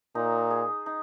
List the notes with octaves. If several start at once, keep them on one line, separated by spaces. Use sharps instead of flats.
A#2 D#4
G#4
D#4